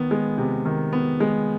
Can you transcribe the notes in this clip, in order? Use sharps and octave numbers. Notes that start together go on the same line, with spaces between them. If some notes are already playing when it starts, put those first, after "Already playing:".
Already playing: D#3 B3
G#3
C3
D#3
B3
G#3